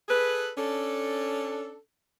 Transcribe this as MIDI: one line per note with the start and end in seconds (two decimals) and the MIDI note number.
0.09 0.50 68
0.09 0.50 69
0.09 0.50 71
0.57 1.77 61
0.57 1.77 62
0.57 1.77 69